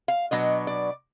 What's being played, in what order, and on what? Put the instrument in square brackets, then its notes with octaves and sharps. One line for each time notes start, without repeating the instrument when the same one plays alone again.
[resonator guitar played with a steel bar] F5
B2 F#3 B3 D4 D#5
D5